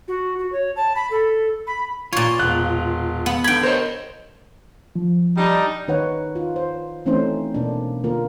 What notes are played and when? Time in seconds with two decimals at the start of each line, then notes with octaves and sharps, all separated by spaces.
0.08 F#4
0.39 F#4
0.52 C#5
0.76 A5
0.95 B5
1.11 A4
1.67 B5
2.13 A#2 F4 C#5
2.39 E1 F#6
3.26 B3
3.44 D3 G5 B5 G#6
3.63 A#4 C5 C#5 D#5
4.96 F3
5.37 G3 D4 D#4
5.88 D#3 D#4 B4 C#5 F#5
6.36 F4
6.56 C5
7.06 E3 A3 C4 C#4 D#4 C5
7.54 B2 A#3 D4
8.04 D3 A#3 F4 A#4